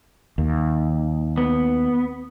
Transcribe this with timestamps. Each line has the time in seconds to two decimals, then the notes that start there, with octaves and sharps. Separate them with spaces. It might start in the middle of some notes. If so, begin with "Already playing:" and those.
0.38 D#2
1.38 B3